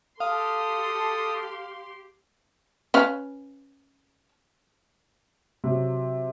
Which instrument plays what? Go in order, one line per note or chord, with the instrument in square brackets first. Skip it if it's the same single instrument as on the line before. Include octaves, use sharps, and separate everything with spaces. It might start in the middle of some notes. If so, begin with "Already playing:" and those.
[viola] G4 C6 [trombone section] A4 [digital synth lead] F5 [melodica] D#6
[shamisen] C#4 B4 F5
[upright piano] C3 F#3